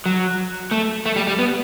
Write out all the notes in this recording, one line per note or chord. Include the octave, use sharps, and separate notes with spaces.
F#3
A3
A3
G3
G3
B3